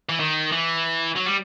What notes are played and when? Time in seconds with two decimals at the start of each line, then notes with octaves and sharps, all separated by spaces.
0.09 E3
0.20 D#3
0.52 E3
1.16 F#3
1.26 G3